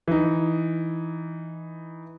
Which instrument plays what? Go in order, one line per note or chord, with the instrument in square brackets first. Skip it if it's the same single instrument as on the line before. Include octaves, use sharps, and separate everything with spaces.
[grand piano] E3 D#4